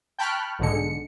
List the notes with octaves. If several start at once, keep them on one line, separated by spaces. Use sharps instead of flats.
G5 A5 B5 C#6 F6 F#6
B1 G#2 D3 G#3 C#7